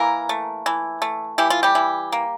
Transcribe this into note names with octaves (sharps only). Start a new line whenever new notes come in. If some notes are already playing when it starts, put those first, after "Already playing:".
Already playing: E3 A#3 A#4
A3
E3
A3
E3 G4
F4
G3 G4
E3
A#3